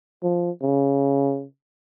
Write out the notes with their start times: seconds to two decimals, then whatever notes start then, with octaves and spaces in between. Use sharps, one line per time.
0.23 F3
0.62 C#3